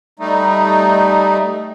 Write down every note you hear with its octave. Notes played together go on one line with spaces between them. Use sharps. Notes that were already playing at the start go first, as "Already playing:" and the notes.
G3 A3 D#4